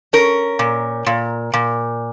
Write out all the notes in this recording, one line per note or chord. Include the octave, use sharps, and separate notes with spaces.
C#4 A#4
A#2
A#2
A#2